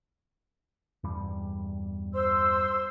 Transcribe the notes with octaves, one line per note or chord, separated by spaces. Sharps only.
E2 G2 G3
C5 C6 E6